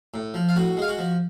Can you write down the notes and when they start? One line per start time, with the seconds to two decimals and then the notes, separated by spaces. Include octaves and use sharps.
0.14 A2
0.34 F3
0.49 F5
0.56 A2 F#4 F#5
0.77 G#3 F5
0.88 F#4 F#5
0.99 F3